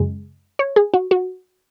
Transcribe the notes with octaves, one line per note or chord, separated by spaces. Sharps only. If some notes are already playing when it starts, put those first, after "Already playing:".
Already playing: F#2 C#3 G#3
C#5
G#4
F#4
F#4